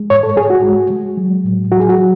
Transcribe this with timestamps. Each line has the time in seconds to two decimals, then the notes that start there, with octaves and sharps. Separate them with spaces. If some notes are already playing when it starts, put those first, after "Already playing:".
Already playing: G#3
0.10 G#2 C#5
0.23 A4
0.37 G#3 G#4
0.50 F#4
0.64 G#3
0.91 G#3
1.17 F#3
1.44 A2
1.72 F#3 F#4
1.80 G#4
1.89 F#4
1.98 F#3